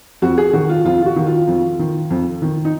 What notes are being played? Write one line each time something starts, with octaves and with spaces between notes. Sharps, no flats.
F2 F#4
G#4
D#3 F#4
F4
F2 F4
F4
F#4
D#3
F4
F2
D#3
F2
D#3
D#4